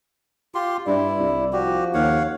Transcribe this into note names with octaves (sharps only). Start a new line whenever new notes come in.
F4 G4 C6
G2 E4 D5
C2
F3 F#4 G4
D#2 C#5 F5 F#5